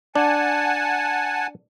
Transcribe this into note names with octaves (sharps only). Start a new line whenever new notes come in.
D4 F#5 G#5 A5